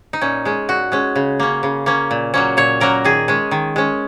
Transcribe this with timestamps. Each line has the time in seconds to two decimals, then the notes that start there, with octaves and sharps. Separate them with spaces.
0.13 D#4
0.21 A#2 C#4
0.45 G#3 C#4
0.68 A#2 F#4
0.92 G#3 C#4
1.16 C#3
1.40 A#3 C#4
1.63 C#3
1.86 A#3 C#4
2.11 A#2
2.34 F#3 A#3 C#4
2.57 A#2 C#5
2.81 F#3 A#3 C#4 A#4
3.04 D#3 G#4
3.28 G#3 C#4
3.51 D#3
3.76 G#3 C#4